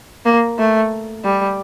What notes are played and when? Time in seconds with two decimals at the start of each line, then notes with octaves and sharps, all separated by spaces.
0.26 A#3
0.59 A3
1.24 G3